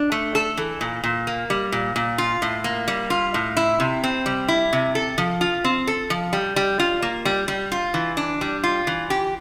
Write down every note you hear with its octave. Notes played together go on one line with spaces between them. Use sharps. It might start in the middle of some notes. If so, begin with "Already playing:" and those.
Already playing: D4
A3
A4
E3
A#2
A#2
A#3
G3
A#2
A#2
F4
A2
A#3
G3
F4
A2
E4
C3
C4
G3
E4
C3
A4
F3
F4
C4
A4
F3
G3
G3
F4
A#3
G3
G3
F4
E3
D4
G3
F4
E3
G4